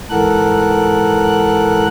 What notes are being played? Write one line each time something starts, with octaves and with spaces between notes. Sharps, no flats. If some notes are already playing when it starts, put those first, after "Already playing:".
G#2 E3 A4 A#4 F#5 F#6